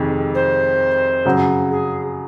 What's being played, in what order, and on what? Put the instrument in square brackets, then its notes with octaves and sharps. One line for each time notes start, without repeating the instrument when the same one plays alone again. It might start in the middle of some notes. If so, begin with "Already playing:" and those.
Already playing: [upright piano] F2 C3 D#3 G#3
[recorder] C5
[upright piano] F#2 C#3 F#3
[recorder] G#4